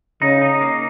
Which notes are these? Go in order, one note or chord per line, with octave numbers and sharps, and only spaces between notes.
C#3 D#4
D#4
A#3